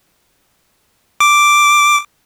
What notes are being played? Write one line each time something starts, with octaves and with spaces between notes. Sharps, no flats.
D6